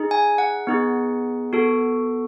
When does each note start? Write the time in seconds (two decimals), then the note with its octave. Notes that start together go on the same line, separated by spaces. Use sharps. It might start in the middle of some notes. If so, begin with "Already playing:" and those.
Already playing: D#4 G#4
0.11 G#5
0.38 F#5
0.67 B3 D#4 G#4
1.53 B3 F#4 A4